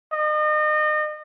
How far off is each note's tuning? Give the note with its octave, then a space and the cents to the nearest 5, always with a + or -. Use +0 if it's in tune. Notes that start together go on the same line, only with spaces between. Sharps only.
D#5 -35